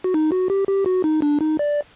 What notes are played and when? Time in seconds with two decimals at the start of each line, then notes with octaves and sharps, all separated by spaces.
0.04 F#4
0.14 D#4
0.32 F#4
0.50 G4
0.68 G4
0.86 F#4
1.04 D#4
1.22 D4
1.41 D#4
1.59 D5